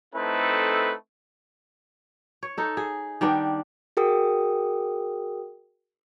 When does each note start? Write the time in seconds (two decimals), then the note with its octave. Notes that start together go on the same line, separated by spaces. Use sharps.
0.15 A3 C4 D#4 E4 A4 B4
2.43 C#5
2.58 D#4 A4
2.77 G#4
3.21 D#3 G3 B3 D4
3.97 F#4 G#4 A#4 G5 D#6